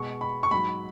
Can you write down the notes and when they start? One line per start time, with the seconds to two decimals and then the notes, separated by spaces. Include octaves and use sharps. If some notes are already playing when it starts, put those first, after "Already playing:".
Already playing: B2 G#3 C#6
0.21 B5
0.43 C#6
0.51 G#2 F#3 B5